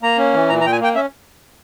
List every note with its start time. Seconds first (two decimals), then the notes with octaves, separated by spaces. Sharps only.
0.03 A#3 A#5
0.17 C#4
0.33 E3
0.49 A#2 A#5
0.61 A#5
0.64 A#2 G5
0.72 G#5
0.80 A#3 G5
0.95 C#4 E5